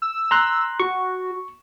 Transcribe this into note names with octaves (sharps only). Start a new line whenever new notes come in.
E6
A#5 C6 F#6
F#4 C#6